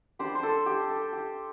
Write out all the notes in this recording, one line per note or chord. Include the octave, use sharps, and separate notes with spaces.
G3 D4 G4 C5
C5
A4
G4
A4
G4